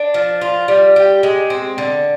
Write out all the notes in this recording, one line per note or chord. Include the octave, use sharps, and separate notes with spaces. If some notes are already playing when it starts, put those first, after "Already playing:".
Already playing: D4
F3
F4
G3
G4
G#3
C4
D3